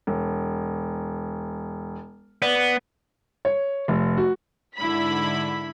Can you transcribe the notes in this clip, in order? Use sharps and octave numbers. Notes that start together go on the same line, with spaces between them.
E1
B3 D5
C#5
F1
F#4
G#2 D3 E4 B5 B6